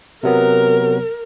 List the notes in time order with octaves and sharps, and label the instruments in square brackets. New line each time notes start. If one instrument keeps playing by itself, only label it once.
[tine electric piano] C3 F#3 B3 [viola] A#4